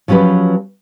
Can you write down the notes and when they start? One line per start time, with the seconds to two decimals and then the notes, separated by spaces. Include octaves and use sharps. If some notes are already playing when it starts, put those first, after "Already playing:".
0.08 F3 F#3 C#4 G4 B4